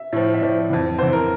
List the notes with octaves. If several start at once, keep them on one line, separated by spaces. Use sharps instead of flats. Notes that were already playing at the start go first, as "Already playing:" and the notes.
Already playing: E5
A2 F3
E5
A2 F3 D5
F2 E3
F2 E3 C5
A#4